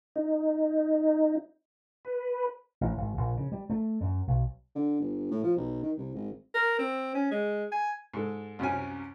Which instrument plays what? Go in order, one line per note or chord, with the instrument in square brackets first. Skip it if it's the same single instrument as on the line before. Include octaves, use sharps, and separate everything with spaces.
[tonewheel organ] D#4
B4
[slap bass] A1
G#1
A#1
C#3
G3
A3
F#2
B1
[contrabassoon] D3
G1
A2
F3
B1
D#3
C2
G#1
[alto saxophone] A#4
C4
C#4
G#3
G#5
[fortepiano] G#2 A4
C2 F#2 C#4 G#5